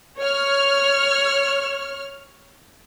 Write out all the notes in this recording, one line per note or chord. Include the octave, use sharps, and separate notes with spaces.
C#5 F6